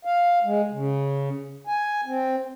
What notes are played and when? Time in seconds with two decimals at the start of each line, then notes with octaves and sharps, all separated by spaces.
0.05 F5
0.44 G#3
0.72 C#3
1.67 G#5
2.06 C4